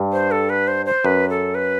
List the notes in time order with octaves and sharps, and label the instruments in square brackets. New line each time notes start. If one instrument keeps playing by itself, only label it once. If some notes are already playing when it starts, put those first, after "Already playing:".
Already playing: [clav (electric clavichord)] G2
[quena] C5
A4
B4
C5
C5
[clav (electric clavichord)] F#2 [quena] B4
[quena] A4
B4